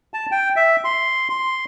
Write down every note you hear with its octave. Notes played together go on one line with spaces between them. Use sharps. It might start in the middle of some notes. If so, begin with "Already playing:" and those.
A5
G5
E5
C6
C6